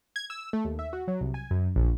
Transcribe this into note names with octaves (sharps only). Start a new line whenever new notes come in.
G#6
E6
A3
D#2
E5
F#4
F#3
C2
G#5
F#2
A#1